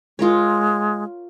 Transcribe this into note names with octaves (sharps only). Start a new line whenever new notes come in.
G#3 F4 A#4 C#5